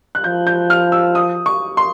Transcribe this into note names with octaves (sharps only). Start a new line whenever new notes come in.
F#6
F3 G6
G6
F6
E6
D#6
C#6
C6